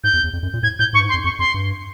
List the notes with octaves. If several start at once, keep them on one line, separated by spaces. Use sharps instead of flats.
G#2 G6
E2
E2
F2
F#2
A#2
A2 G#6
A2 G6
G#2 C#6
G2
G#2
C6
F2
F2 C#6
F2 C6
G2